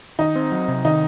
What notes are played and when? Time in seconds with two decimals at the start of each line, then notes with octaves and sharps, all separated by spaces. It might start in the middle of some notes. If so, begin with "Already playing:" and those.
0.19 D#3 D#4
0.36 C4
0.52 F#3
0.68 C3
0.85 D#3 D#4